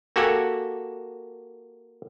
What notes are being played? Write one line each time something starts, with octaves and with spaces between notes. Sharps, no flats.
A#3 F#4 G4 A4 F#5 G#5